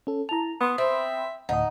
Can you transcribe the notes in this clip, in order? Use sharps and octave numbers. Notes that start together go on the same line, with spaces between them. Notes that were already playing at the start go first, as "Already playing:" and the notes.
C#4 A4
E4 A5 A#5 F7
B3 B5 C6 D#6
C4 E5
D2 A2 D#4 D#5 F#5